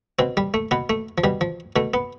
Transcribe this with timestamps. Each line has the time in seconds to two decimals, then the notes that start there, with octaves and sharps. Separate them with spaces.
0.19 B2 C4
0.37 G3
0.54 A3
0.71 B2 B3
0.89 A3
1.18 F3
1.24 B2 G3
1.41 F3
1.76 B2 A3
1.94 B3